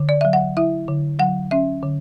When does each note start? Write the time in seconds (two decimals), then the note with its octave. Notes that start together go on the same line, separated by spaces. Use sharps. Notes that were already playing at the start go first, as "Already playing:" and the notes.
Already playing: D3
0.09 D5
0.21 F#3 E5
0.33 F#5
0.57 E4 E5
0.88 D3
1.19 F#3 F#5
1.51 C#4 E5
1.83 D3